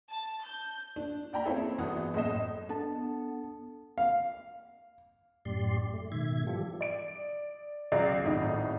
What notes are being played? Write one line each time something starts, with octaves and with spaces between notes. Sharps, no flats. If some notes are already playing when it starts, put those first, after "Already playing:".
A5
G6
D4
D5 G5 A#5 B5
A#3 C4 C#4 E4 G#4 A4
G1 E2 E3 F#4 D#6
F#1 A2 D#5 E7
B3 D4 A4 A5
F5
F#2 A2 G4 D5 C6
A3
G#2 B2 D#3 E5 G#6
E3 F3 G3 F4 G4 A4
D5 D7
C#2 F#3 D5 C7
G#1 A2 D#4